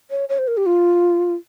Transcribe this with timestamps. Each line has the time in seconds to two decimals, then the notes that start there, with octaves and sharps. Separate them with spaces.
0.11 C#5
0.29 C#5
0.39 C5
0.48 A#4
0.57 G4
0.66 F4